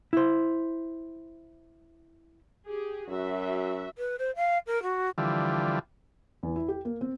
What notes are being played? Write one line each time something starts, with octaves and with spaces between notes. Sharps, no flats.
E4 C5
G4 G#4
F#2 F#4 E5
B4
C5
F5
A#4
F#4
D3 E3 F3 G3
E2
E4
G4
A#3
C4